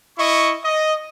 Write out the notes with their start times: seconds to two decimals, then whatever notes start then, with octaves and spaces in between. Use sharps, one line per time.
0.18 E4 D#5 C#6
0.64 D#5